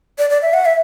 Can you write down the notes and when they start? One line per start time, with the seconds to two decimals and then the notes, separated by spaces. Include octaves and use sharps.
0.18 D5
0.30 D5
0.42 E5
0.54 F#5
0.65 E5